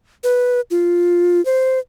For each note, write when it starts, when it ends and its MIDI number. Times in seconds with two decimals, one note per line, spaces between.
0.24 0.61 71
0.71 1.43 65
1.45 1.79 72